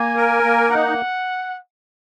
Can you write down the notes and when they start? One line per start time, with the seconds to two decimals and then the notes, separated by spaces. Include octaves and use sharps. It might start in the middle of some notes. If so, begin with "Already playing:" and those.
Already playing: A#3 G#5
0.16 A#4
0.43 A#3
0.71 D#4 F#5